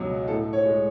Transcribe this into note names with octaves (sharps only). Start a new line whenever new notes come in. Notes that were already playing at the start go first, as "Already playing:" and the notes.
Already playing: C#2 B2 F#3 F#4
A2 A4
C#5
G#3